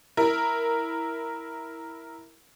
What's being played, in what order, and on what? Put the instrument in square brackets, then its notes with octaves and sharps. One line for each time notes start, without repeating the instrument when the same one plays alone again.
[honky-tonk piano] E4 A#4